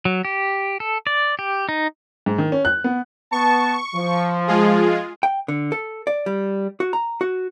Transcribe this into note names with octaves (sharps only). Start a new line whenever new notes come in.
F#3
G4
A4
D5
G4
D#4
G#2
D#3
C#4
F#6
B3
B3 A5 C#6
F3
G#3 F4 G#4
G5
D3
A4
D5
G3
F#4
A#5
F#4